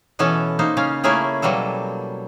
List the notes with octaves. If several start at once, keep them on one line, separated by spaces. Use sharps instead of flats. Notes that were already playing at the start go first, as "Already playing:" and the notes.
B2 E3 B3 C#4 A4
A#3 D#4 C5
C#3 C#4 F5
A3 A#3 C#4 E4 G#4 A#4
B2 F#3 G3 A#3 A4